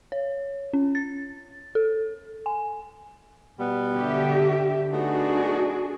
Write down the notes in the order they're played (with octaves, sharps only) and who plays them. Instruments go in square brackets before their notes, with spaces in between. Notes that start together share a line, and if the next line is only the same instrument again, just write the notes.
[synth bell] C#5
C#4
A6
A4
G#5
[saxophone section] B2 G3 B3
[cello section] D3 G4 E5
[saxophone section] A3 B3 D#4 [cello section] D4 F#4 G#4